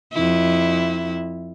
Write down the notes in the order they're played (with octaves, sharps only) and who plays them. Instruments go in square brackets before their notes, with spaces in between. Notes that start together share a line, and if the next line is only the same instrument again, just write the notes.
[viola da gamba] F2 E4